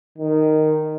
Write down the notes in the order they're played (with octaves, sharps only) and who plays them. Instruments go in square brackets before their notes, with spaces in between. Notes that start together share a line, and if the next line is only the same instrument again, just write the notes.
[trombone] D#3